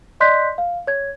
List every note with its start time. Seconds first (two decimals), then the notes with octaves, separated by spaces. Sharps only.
0.20 D5 D#5 C6 F#6 G6 B6
0.58 F5
0.87 C#5 G#6